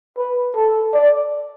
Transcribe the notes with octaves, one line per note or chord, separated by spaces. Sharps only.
B4
A4
D5